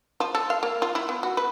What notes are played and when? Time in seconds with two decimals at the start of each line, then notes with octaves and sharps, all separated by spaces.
0.20 F3
0.35 A4
0.50 F5
0.63 A#3
0.82 F4
0.95 E4
1.09 B3
1.23 F#4
1.37 B4